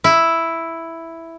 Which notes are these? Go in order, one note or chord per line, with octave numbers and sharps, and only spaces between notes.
E4